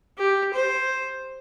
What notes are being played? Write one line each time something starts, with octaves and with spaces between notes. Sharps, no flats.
G4
C5